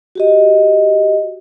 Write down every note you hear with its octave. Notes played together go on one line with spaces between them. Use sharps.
F#4 G4 D#5